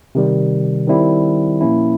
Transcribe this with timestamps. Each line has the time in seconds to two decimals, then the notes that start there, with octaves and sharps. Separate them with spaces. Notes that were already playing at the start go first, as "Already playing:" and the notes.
0.15 C3 D#3 G3
0.88 D#3 G3 C4 E4
1.61 A#2 F3 A#3 C#4 E4